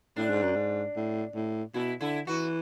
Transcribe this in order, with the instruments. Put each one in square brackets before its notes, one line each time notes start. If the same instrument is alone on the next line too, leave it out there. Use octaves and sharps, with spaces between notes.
[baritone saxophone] A2 [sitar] D4
[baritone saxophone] G#2
F#2
G#2
A2
A2
[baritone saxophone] B2 [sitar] E4
[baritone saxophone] D3 [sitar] E4
[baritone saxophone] E3 [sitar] F#4